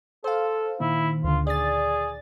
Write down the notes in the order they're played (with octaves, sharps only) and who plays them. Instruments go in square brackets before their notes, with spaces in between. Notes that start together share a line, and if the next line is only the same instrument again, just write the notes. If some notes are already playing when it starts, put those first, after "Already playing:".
[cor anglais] A4 [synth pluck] C5 F5
[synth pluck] A#2 D#3 [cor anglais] E4
[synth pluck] D2 D3 [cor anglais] F4
[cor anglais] G#4 [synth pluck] D5 A6